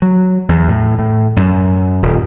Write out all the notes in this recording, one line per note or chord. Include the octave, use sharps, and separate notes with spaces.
F#3
E2
A2
A2
F#2
D#1